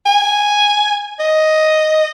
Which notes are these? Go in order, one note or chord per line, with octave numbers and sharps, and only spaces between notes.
G#5
D#5